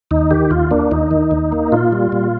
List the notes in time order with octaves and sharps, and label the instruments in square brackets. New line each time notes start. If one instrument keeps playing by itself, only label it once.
[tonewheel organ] D#2 D#4
D#3 G4
D#2 F4
A#3 D4
D#2 D#4
D#3
D#2
A#3
A#2 F4
G3
A#2